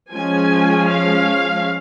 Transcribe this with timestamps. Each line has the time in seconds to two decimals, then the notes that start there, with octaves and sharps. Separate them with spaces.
0.12 F3 G#3 C#4 G#5
0.87 F5